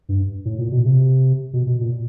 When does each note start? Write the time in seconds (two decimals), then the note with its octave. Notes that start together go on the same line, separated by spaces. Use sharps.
0.09 G2
0.45 A2
0.59 A#2
0.72 B2
0.85 C3
1.53 B2
1.67 B2
1.81 A#2